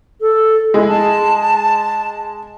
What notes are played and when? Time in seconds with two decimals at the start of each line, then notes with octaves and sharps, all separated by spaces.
0.21 A4
0.74 G#3 E4
0.88 A5